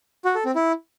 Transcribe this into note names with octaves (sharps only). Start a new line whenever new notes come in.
F#4
A4
C4
E4